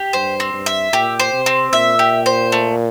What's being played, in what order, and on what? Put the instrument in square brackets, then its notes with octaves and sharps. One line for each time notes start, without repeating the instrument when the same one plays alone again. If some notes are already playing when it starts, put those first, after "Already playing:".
Already playing: [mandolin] G4
[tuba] G2 [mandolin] C5
[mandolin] C4
[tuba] G2
[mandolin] E5
[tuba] A#2 [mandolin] G4
[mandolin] C5
[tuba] C3
[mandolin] C4
[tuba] A#2 [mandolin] E5
[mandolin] G4
C5
A3